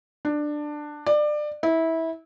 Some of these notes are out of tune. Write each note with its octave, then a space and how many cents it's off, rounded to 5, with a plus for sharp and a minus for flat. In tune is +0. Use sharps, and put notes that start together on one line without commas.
D4 +15
D5 +25
E4 -20